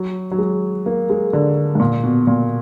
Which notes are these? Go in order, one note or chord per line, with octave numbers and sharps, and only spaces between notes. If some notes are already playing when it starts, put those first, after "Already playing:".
Already playing: F#3
F#3
G#3
A#3
G#3
D3
G#2
A#2
B2
A#2